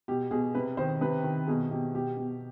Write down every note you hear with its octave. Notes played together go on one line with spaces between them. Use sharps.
B2 G4
B2 G#4
C3 B4
D#3 C5
C3 B4
D#3
B2 G#4
B2 G4
B2 G4
B2